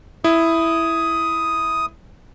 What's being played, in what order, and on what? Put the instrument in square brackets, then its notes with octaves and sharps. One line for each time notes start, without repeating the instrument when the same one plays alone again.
[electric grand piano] E4 [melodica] D#6